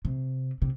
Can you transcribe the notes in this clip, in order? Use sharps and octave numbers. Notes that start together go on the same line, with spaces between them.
C3
C3